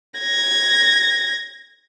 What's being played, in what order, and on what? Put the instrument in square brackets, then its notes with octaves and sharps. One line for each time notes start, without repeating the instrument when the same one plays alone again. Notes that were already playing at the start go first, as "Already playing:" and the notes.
[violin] G#6 A#6